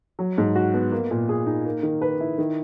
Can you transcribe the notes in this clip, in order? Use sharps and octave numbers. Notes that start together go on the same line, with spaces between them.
F#3
G#2
F#4
B3
A#3
A#2
G#4
D#4
A#3
D#3
B4
E4
D#3